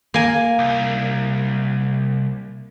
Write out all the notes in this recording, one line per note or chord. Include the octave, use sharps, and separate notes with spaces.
A#3 G#5
C2